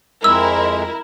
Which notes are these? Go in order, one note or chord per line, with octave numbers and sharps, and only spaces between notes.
F2 G#3 E4 A#4 E6